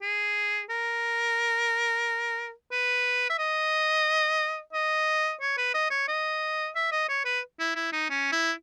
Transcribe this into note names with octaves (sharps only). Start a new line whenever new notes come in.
G#4
A#4
B4
E5
D#5
D#5
C#5
B4
D#5
C#5
D#5
E5
D#5
C#5
B4
E4
E4
D#4
C#4
E4